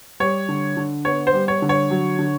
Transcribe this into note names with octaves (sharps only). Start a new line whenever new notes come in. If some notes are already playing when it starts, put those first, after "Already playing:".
G3 C#5
D3
D3
B3 C#5
C5
G3
C#5
D3
C#5
F#3
D3